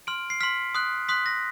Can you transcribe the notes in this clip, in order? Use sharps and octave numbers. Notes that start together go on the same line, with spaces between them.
C6 F6 D7
C7
C6 F6 B6
C6 D#6 F#6
C6 D#6 F#6 B6
A#6